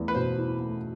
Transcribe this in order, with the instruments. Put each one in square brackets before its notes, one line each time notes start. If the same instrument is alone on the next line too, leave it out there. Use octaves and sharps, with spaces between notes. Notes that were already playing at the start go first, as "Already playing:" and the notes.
Already playing: [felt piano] E2 A3
[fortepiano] B4
[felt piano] B2 [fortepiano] C5
[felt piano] E4
A3